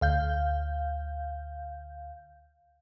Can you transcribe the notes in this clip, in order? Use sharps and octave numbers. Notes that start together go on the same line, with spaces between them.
D2 F5 G6